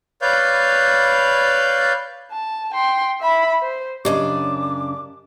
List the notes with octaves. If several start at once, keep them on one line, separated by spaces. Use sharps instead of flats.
B4 C#5 D5 F5 G6
A5
G5 C6
E5 B5
C5
F#2 C#3 D4 G4 D5 D#5 D6